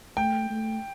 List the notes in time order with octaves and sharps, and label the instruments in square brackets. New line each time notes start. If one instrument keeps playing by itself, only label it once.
[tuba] A3 [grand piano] G5
[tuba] A3